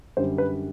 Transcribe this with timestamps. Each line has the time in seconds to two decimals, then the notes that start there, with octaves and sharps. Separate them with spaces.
0.17 F#2 D3 G3 C5
0.38 B4